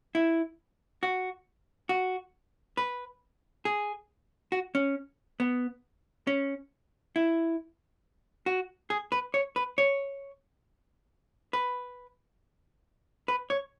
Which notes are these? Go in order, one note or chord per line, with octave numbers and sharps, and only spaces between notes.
E4
F#4
F#4
B4
G#4
F#4
C#4
B3
C#4
E4
F#4
G#4
B4
C#5
B4
C#5
B4
B4
C#5